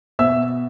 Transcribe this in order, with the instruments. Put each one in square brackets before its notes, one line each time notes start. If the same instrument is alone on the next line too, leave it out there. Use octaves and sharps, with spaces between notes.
[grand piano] B2 E5 E6